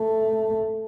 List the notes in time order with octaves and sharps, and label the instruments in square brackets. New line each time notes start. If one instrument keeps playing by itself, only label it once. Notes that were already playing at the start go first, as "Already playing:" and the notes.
Already playing: [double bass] A3